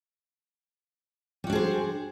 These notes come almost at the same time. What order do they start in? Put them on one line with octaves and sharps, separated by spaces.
G3 F#4 D4 G#4 C5